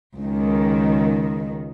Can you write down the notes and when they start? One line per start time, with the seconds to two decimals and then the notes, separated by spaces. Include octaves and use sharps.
0.18 C#2 D#3